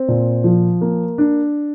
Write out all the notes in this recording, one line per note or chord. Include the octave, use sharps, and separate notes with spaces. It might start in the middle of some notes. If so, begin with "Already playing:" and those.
Already playing: C4
A#2
F3
A#3
D4